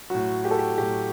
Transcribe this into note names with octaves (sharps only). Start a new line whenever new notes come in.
A2 F#3 F#4
G4
A4
G4
A2 F#3 G4